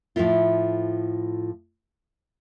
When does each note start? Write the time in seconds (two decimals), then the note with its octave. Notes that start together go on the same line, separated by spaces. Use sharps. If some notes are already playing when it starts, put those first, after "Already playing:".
0.16 A2 F3 A3 E4 F4